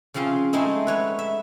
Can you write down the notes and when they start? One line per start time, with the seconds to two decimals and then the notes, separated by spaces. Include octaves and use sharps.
0.14 C#3 F3 C4 F4 G#4
0.53 G#3 A3 C4 D#4 E4
0.87 B4 C#5 F#5
1.19 E5